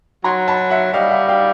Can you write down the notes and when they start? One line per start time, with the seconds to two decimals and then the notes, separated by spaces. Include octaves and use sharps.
0.24 F#3 A#5 C6
0.48 A5 B5
0.70 E5 F#5
0.93 G3 D#5 F5
1.11 E5 F#5
1.28 F5 G5